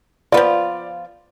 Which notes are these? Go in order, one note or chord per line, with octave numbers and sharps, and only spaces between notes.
F3 B3 F4 D5